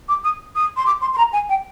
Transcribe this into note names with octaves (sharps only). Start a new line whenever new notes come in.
D6
D#6
D#6
C6
D6
C6
C6
A#5
G#5
G5